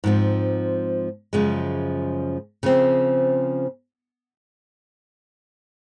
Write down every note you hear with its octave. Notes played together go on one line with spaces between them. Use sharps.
G#2 F3 C4
F#2 C#3 F3 G#3
C#3 F3 C4